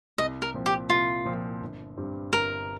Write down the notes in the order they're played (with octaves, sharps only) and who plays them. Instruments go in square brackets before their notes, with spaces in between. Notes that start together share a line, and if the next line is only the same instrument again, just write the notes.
[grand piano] C2 [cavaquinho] D#5
[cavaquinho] A#4
[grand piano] A#2 F3 C4
[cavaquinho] G4
[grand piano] C2 [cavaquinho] F4
[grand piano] A#2 F3 C4
G1
G2 G3 C4
[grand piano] G1 [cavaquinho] A#4